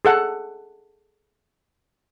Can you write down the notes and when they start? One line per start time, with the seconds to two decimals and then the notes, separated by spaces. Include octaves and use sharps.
0.05 G#4 A4 F#5